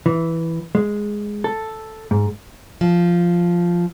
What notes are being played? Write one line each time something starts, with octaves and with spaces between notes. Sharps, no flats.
E3
G#3
A4
G#2
F3